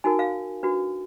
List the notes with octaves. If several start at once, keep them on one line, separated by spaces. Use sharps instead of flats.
D#4 F#4 A#4 G#5
F5
D4 F#4 B4